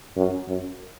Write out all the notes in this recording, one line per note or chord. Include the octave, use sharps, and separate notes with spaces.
F#2
F#2